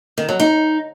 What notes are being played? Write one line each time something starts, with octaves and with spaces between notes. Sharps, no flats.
D#3
F#3
D#4